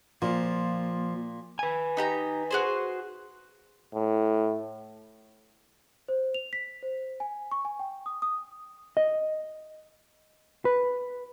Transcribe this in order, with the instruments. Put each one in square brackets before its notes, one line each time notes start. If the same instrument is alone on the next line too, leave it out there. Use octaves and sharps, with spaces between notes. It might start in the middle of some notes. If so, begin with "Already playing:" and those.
[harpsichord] A#2 [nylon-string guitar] F3 [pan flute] A#3
[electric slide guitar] B4 G#5
[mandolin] D#4 G4 A#5
F#4 G#4 C5
[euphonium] A2
[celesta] C5
F7
B6
C5
G#5
C#6
G#5
G5
D#6
D#6
[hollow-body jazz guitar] D#5
B4